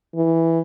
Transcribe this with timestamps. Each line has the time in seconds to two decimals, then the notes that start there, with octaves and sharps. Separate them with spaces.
0.15 E3